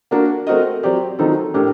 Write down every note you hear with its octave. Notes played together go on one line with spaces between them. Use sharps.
A#3 D4 F#4
A3 C4 F#4 A#4 D#5
F#3 C4 G4 D5
D#3 F#3 C4 D#4 A4
A2 A3 D4 G4 A#4